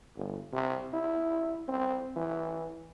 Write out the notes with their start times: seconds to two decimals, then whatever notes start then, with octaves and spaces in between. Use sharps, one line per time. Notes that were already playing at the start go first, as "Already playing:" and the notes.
0.16 G1
0.53 C3
0.93 E4
1.68 C4
2.16 E3